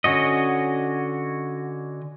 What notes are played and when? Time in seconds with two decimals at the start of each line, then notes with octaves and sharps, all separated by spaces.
0.04 D3 C#4 F#4 D#5